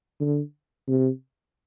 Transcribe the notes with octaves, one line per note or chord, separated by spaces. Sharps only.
D3
C3